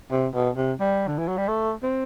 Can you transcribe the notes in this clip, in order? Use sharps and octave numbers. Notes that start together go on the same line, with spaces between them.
C3
B2
C3
G3
D3
E3
F#3
G3
A3
C4